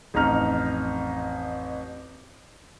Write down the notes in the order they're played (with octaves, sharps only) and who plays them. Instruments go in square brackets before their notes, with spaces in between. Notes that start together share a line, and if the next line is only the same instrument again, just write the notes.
[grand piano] A1 F2 D#4 A#5 F6